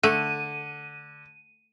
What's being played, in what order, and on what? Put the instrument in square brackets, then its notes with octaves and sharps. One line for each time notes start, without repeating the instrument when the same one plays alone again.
[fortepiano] D3 [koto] A3 [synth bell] D#7